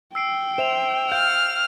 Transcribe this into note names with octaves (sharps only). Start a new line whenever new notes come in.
G5 E6 C7 D7
C5 E5 E7 F7
F5 F6 G6